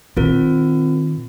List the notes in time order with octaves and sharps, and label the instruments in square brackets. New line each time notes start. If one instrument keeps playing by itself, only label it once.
[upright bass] A#2 D#3 [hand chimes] C4 F4 A#4